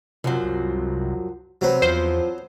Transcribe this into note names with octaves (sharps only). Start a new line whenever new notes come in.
F#2 C3 F3 F#3
C2
C3 F#3 C4 B4
E2 F3 C5